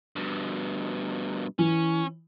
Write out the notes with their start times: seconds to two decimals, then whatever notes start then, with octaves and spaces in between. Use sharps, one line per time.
0.16 G2 B2
1.59 E3 C#4